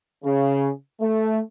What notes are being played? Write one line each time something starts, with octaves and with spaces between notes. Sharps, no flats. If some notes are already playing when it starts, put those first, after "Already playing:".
C#3
A3